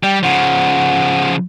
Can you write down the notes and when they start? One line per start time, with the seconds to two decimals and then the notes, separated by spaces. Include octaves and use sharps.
0.03 G3 G5
0.23 C#3 F3 F#5